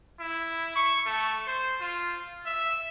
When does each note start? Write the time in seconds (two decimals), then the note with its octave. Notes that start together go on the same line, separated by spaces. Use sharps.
0.20 E4
0.76 C#6
1.06 A3
1.47 C5
1.81 F4
2.46 E5